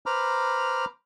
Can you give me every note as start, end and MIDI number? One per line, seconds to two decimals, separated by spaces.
0.06 0.85 71
0.06 0.85 72
0.06 0.85 82
0.06 0.85 83
0.06 0.85 86
0.06 0.85 89